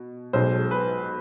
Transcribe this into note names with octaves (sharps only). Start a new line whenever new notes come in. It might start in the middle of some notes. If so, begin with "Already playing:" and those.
Already playing: B2
B1 B2 G#3 C5
B4